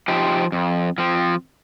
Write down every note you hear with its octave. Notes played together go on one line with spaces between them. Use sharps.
F3 D#4 G4 C5
F2
F3 C4